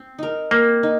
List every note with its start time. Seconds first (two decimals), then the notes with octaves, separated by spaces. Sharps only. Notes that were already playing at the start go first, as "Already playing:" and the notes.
Already playing: C4
0.19 D#4 A#4
0.51 A#3 C4
0.83 D#4